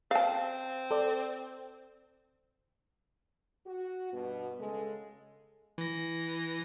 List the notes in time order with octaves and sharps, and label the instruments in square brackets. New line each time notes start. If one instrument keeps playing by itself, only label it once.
[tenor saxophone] C4 [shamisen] F5 A5
[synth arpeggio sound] A4 C5 D5
[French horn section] F#4
G2 B2 B3
C#3 G#3 A4
[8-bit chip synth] E3 A#6